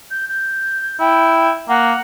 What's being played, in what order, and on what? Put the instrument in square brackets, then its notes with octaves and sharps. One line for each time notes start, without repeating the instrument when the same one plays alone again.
[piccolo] G6
G6
[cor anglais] E4 [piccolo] G5
[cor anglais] A#3 [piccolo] F#5